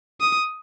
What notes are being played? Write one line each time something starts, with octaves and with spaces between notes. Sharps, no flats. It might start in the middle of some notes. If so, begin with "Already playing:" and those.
D#6